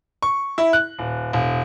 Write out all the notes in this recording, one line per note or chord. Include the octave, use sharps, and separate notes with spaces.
C#6
E4
F#6
D#1
E1